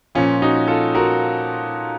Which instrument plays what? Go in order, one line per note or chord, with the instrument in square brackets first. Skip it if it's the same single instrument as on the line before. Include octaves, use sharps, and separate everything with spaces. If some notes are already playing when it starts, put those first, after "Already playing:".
[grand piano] A#2 F3 C#4 F4
D#4 F#4
F4 A4
F#4 A#4